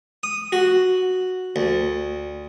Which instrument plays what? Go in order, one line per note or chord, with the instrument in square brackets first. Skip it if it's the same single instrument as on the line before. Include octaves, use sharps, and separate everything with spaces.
[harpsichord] D#6
F#4
D2